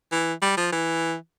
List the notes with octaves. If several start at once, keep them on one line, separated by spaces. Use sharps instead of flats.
E3
G3
F3
E3